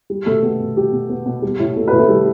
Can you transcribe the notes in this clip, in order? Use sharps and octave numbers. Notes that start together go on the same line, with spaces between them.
G3
B2 A3 A4
B3 G4
B2
G3 G4
B2
B3
B2
G3
A2
B3 A4
A2 B4
A3 A4
G3